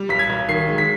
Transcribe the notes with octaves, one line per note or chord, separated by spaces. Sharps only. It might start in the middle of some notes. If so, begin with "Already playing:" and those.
Already playing: G3
B1 B6
G#6
B1
D#3 C7
G#3
B6